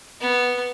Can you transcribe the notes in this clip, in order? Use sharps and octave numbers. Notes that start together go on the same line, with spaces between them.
B3